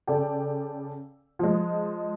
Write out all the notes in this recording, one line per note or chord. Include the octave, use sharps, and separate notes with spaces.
C#3 A4 D5 G5
F3 G#3